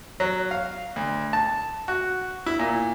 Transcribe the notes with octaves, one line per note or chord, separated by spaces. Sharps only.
F#3
F5
D2
A5
F#4
E4
A#2